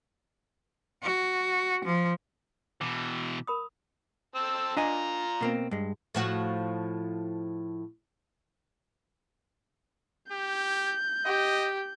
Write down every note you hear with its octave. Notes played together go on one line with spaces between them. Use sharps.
F#4
F3
B2 E3 D6
A#4 B5 D#6
C4 A5 E6
D4 F4 D#5 G#5 A#5
B2 A#3 C4
G2 G#3
A2 F3 F#4
G4 G6
G4 D#5